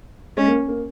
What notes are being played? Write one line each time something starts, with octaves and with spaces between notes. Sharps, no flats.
G#3 C#4
A#3
A#3